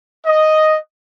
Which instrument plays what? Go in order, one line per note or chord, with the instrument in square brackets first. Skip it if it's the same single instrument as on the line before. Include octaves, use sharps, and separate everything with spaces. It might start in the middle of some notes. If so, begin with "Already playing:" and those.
[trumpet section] D#5